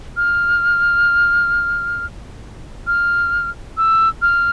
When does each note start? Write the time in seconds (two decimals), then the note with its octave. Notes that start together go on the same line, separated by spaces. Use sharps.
0.17 F6
2.87 F6
3.77 E6
4.22 F6